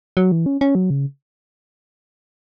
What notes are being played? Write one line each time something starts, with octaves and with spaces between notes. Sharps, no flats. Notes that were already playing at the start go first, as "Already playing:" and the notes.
F#3
E3
C#4
C#4
F#3
C#3